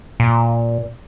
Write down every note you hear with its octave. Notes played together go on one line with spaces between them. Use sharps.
A#2